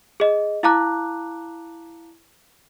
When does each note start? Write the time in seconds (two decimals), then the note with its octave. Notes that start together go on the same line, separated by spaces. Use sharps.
0.20 G#4 D#5
0.63 E4 F5 A5 A#5 D6 F#6